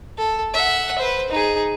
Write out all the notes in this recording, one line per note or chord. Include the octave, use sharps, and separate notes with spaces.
A4
E5 F#5
B4 C5
D#4 G#4